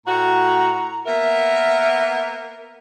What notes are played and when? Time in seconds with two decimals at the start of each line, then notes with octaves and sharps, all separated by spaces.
0.06 A2 F#4 A#5
1.06 A#3 B3 A#4 E5